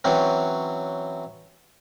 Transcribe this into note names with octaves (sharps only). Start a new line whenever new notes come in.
E3 F#3 C4 C#4